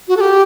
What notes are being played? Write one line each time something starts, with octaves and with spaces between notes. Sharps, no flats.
F#4
A4
G4